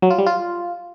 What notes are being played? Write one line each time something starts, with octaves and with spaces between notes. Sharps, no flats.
F#3
F4
G3
F4